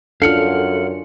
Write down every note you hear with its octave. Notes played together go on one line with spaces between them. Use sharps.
F#2 D4 F4 A4 F5 F#5 F6